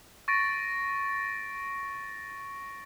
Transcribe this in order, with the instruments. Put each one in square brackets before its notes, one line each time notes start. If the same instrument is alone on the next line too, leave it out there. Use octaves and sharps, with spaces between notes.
[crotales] C#6 A6 A#6 D7